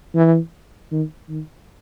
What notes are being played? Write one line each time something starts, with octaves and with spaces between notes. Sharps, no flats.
E3
D#3
D#3